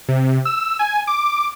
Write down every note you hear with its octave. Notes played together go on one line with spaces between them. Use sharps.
C3
E6
G#5
D6